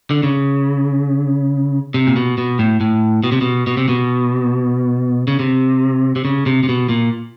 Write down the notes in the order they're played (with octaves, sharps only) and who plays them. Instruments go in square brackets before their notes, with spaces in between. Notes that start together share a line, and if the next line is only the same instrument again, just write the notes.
[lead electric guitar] D3
C#3
C3
A#2
B2
B2
A2
A2
B2
C3
B2
B2
C3
B2
C#3
C3
C3
C#3
C3
C3
B2
A#2